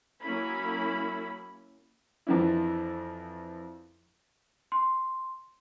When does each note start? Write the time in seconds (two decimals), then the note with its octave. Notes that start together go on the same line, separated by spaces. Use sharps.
0.21 F#3 A#3 C#4 E4 B5
2.27 F2 E3 F3 D4 E4
4.72 C6